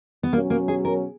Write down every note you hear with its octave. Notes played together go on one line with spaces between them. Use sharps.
B3
B2 F#3 A#3 C#4
A#3
G#4
A#4